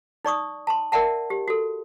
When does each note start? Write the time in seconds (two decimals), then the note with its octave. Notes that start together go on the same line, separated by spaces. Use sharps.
0.25 D#4 D5 C#6 D#6
0.67 A5 C6
0.92 A#4 D5 E5 F#5 A5
1.30 G4
1.48 F#4 A4